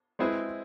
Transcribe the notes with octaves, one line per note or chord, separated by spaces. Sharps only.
G#3 C4 E4 G#4 B4